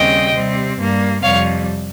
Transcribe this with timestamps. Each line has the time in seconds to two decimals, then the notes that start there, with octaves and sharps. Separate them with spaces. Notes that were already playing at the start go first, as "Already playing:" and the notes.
Already playing: D#2 C#3 G3 C4 D#5 G5
0.34 C3 G3 C4
0.78 G2 G3 A#3
1.23 F2 C3 G3 C#5 F5